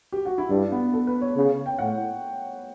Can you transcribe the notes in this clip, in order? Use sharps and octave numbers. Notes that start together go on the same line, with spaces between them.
G4
F#4
E4
G2 D4
B3
A4
B4
C#5
C#3
G5
A2 F#5